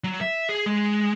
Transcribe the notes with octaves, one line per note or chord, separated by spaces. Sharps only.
F#3
E5
G#4
G#3